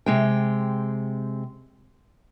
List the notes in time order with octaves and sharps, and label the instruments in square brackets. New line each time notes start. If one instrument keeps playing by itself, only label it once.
[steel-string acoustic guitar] C3 G#3 G5